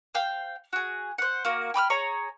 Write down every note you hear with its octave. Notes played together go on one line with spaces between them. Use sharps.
C5 F5 G5
F#4 G#4
C5 F#5
A#3 F#4
G5 B5 D#6 F6
G#4 C#5 A#5